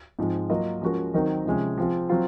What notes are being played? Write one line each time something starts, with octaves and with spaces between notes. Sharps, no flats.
G#2 F3 G#3 C4
F#3 A#3 F4 A#4 D#5
F3 G#3 C#4 F#4 A#4
D#3 F#3 C4 D#4 A#4
C3 F3 G#3 C#4
F3 C4 F4 G#4
F#3 C4 F4